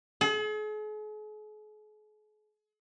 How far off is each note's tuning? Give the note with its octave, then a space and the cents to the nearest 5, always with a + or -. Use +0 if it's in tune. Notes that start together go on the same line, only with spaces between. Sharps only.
G#4 +45